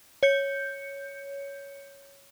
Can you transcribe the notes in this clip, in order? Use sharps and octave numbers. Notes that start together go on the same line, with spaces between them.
C#5 G6 C#7